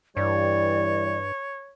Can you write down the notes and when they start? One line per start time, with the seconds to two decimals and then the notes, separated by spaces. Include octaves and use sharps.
0.17 G2 E3 G3 C#5 D5